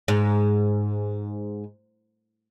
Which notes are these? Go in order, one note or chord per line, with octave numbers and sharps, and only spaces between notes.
G#2